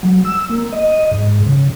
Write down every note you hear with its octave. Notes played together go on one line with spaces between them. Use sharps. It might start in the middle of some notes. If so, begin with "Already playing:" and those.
F#3
E6
A#3
D#5
G#2
C#3